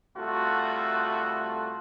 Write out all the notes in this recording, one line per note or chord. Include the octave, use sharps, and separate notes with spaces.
C2 A3 F4 F#4